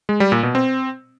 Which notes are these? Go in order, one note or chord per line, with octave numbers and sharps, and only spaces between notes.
G#3
G3
A#2
B2
C4